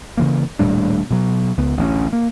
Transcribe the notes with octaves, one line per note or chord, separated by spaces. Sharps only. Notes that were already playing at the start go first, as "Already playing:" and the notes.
C#3 E3 A#3
D#1 A2 G3 D4
B2 F#3
C#2 B3
A1 D2 A#3 C#4
A#3